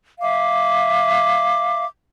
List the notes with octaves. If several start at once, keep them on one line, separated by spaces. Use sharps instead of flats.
E5 F5 D6